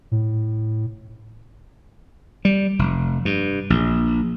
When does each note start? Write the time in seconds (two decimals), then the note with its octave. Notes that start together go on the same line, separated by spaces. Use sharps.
0.11 A2
2.45 G3
2.79 F1
3.25 G2
3.70 A#1